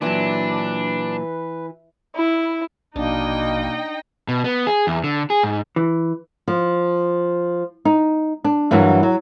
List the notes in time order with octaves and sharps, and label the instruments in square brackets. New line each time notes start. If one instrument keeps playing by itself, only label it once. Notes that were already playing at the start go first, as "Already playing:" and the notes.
[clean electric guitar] A#2 F#3 [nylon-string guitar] E3 [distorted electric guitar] D4 [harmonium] B4
[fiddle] E4
[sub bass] A#1 [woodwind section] B2 A#3 [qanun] D4 [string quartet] D#4 D#5 G5
[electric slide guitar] B2
B3
G#4
E2
D3
G#4
G#2
[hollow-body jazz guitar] E3
[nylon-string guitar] F3
D#4
D4
G2 E3 F#3 A#3 D4 F#4
F#3